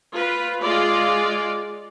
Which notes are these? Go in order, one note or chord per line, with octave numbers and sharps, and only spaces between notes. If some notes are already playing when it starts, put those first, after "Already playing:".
F4 B4
G#3 F4 D5